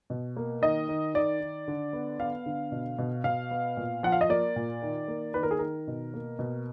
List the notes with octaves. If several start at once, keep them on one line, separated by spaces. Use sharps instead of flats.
B2
A#3
D#3 D#5
D#3
D#3 D5
D#3
D3
B3
B3 F5
D3
B2
B2
B2 F5
B3
A#2
F3 F#5
F5
D#5
A#3 D5
A#2
D#3
A#3
D#3 B4
A#4
G#4
D#3 A#4
B2
A#3
B2